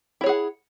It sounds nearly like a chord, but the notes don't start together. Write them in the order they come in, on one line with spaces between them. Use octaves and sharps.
E4 C#5 G#4 F#5